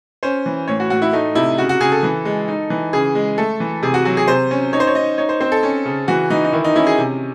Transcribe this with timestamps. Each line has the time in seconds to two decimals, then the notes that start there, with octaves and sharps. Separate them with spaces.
0.23 C#4 C5
0.46 E3
0.68 A2 C#5
0.80 F#4
0.90 A2 F#4
1.02 E4
1.13 A3 D#4
1.35 C3 E4
1.58 C#3 F#4
1.69 F#4
1.80 C#3 G#4
1.92 A4
2.03 E3
2.25 G#3
2.48 D#4
2.70 E3
2.93 C#3 G#4
3.15 G#3
3.38 A3 A4
3.60 E3
3.83 C3 G#4
3.94 F#4
4.05 F#3 F#4
4.17 G#4
4.28 C3 C5
4.51 C#4
4.73 D#4 C#5
4.80 C5
4.87 C#5
4.95 D#4 D#5
5.18 D#4 C#5
5.29 C5
5.40 C4 C5
5.52 A4
5.63 C#4
5.85 C#3
6.08 E3 F#4
6.30 E3 D#4
6.44 D#4
6.53 D#3 E4
6.64 D#4
6.76 C#4 E4
6.87 G#4
6.98 C3